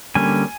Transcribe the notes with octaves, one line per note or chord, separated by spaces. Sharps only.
D3 G3 A#3 C#4 G#5